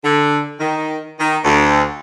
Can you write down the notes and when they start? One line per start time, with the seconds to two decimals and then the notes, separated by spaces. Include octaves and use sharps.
0.04 D3
0.60 D#3
1.20 D#3
1.44 D2